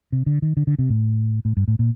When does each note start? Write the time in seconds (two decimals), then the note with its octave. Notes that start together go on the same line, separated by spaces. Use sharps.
0.12 C3
0.26 D3
0.42 D#3
0.57 D3
0.67 D3
0.79 C3
0.90 A2
1.45 A2
1.57 G2
1.68 A2
1.79 A#2